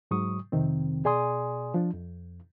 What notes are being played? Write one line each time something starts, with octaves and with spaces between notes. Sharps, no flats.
G#2 F#3 C#6 D#6
F2 C3 D#3 C4
B2 G#4 D5 G#5 C6 D#6
F3 D4
F2